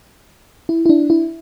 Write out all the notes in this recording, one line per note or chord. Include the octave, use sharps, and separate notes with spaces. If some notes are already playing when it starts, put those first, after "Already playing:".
E4
E4
D4
E4